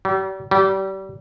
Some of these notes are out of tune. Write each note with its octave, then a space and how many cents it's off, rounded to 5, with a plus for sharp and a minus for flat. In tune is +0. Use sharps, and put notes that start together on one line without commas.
G3 -40
G3 -30